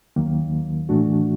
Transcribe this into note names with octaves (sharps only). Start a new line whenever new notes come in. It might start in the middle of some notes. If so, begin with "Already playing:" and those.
D#2 D#3 F#3 A#3
A2 E3 A3 D4 F#4